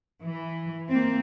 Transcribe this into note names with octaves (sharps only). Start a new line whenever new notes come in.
E3
A#3 C4